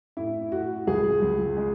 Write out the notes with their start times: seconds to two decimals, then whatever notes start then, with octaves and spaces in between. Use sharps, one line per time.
0.17 A2 E4
0.52 A2 F#4
0.87 C#2 G#4
1.22 C#2
1.57 G#3